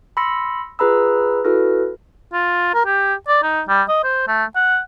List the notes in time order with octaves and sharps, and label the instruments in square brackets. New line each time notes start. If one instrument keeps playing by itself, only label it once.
[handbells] B5 C6 E6 A#6 C#7
F4 G#4 B4 A#5 B5 E6
E4 F#4 A4 B4 F6 A#6
[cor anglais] F4
A#4
G4
D5
D#4
G3
D#5
C5
A3
F#5